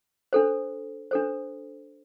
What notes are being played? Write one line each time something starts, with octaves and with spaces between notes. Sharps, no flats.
D4 A4 C5
D4 A4 C5